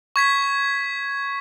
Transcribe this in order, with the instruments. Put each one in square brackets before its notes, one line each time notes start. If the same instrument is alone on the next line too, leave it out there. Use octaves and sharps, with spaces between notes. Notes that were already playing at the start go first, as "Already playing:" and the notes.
[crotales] C#6 G#6 B6